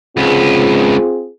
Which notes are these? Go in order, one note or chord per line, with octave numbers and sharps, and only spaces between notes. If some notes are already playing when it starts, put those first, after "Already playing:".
C#2 B3 C4 F4 G#4